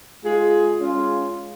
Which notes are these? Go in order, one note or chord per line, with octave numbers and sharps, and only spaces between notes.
G#3 F4 G#4
G#3 C#4 F4